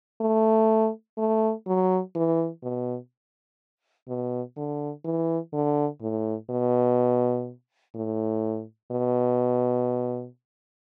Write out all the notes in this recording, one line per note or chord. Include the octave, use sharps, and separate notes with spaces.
A3
A3
F#3
E3
B2
B2
D3
E3
D3
A2
B2
A2
B2